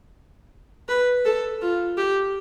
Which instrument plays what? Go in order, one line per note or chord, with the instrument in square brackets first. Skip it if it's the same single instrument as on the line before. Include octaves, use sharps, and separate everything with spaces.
[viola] B4
A4
F4
G4